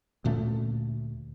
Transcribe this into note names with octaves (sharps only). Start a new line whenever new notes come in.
D2 A#2 A3 C#4